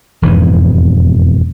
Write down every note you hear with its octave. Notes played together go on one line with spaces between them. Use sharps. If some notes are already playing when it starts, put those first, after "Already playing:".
E1 F2 G#2 E3